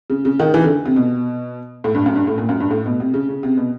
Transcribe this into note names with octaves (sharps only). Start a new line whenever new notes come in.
C#3
C#3
D#3
E3
D3
C3
B2
A2
G2
F#2
G2
A2
A#2
F#2
G2
A2
B2
C3
C#3
C#3
C3
B2